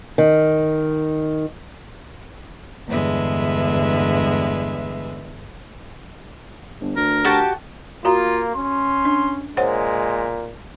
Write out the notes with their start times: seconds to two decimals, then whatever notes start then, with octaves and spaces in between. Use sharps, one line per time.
0.18 D#3
2.88 E2 G2 D3 G#3 B4 E5
6.81 G1
6.96 D2 A#4
7.25 F#4 G4 A5
8.05 A#3 F4 F#4 A#5
8.56 C#4 C6
9.05 D4
9.57 A#2 G#3 C5 C#5 F#5